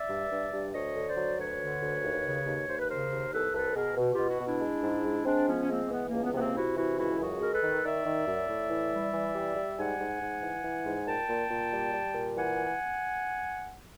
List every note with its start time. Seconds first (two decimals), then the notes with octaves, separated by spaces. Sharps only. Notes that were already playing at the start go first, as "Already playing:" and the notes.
Already playing: D5 E5
0.10 G2
0.32 G2
0.53 G2
0.74 D2 C#5 D#5
0.96 D3
1.07 C5 D5
1.17 F#3
1.39 D2 B4 C#5
1.60 D3
1.82 D2
2.03 D#2
2.24 C#3
2.46 D#2
2.68 D#2 C5
2.79 B4
2.87 C#3 A#4 C5
3.11 D#2
3.32 C2 A4 B4
3.54 C2 A4 B4
3.75 B2 G#4 A#4
3.97 B2
4.13 F4 G4
4.18 B2
4.29 E4 F#4
4.40 B2
4.45 D4 E4
4.61 G#3
4.83 G#2
5.05 G#3
5.26 G#3 C4 D4
5.47 F3 B3 C#4
5.62 C#4
5.69 G#3 A#3 C4
5.84 A#3
5.91 E3 B3
6.07 C#2 A#3
6.23 B3
6.34 C3 B3
6.39 A#3 C4
6.55 C3 E4 F#4
6.76 E3 E4 F#4
6.98 C#2 E4 F#4
7.20 F#2 F#4 G#4
7.41 G#3 A#4
7.52 A4 B4
7.63 D#3
7.84 D#3 D5 E5
8.06 D#3
8.28 F#2
8.49 A2
8.71 E3
8.92 G3
9.13 E3
9.35 G3
9.57 G3
9.78 G#2 F#5 G#5
10.00 G#2
10.22 G#2
10.42 E3
10.65 E3
10.86 G#2
11.07 A#2 G5 A5
11.29 A#2
11.51 A#2
11.72 G3
11.94 G3
12.15 A#2
12.37 E3 F#5 G#5